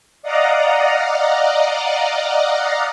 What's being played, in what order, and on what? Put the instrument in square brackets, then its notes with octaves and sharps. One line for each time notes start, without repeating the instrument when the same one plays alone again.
[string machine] D5 D#5 F5 F#5 A#5